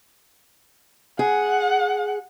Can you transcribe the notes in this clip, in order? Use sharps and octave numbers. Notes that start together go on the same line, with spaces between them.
G#4 F#5